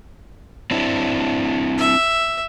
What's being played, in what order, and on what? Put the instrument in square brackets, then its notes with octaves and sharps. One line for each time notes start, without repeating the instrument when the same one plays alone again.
[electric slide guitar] C4 D4 E4
[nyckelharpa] E5